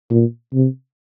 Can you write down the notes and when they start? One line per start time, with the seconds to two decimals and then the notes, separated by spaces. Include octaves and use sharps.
0.11 A#2
0.53 C3